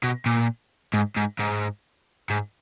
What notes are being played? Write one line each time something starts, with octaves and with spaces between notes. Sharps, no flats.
B2
A#2
G#2
G#2
G#2
G#2